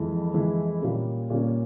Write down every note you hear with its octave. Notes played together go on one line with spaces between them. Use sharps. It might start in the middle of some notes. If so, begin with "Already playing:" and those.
Already playing: F2 E3 G#3 E4
F2 E3 G#3 E4
A#2 G3 A#3 C#4
A#2 G3 A#3 C#4